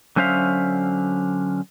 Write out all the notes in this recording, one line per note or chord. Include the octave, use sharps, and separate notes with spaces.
D3 F#3 C#4 C5 E5 F5